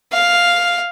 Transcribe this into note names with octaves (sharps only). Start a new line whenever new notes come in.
F5